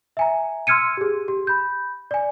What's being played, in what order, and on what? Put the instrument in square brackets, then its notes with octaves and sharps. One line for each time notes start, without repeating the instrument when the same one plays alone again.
[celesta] E5 G#5 A#5
C6 E6 F6 G#6 C#7 D#7
G4 G#4
G4
B5 G6
D5 G#5